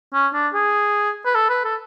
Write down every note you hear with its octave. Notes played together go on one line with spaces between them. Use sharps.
C#4
D4
G#4
B4
A4
B4
A4